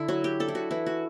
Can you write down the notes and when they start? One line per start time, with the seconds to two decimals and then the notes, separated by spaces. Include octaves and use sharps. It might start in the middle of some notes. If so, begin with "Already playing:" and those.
Already playing: D3 E4
0.08 F#3 F#4
0.24 G4
0.40 D4 A4
0.48 E4
0.55 F#4
0.71 E3 E4
0.86 F#4